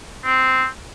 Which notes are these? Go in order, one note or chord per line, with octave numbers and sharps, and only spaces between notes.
C4